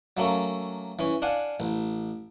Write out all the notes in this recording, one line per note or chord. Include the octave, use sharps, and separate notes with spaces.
F#3 A3 A#3 C#4
E3 C#4
D4 F5 F#5 G#5
A1